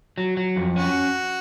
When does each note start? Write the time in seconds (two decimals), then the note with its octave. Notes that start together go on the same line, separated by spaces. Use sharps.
0.18 F#3
0.37 F#3
0.56 F2
0.76 C#4 F#4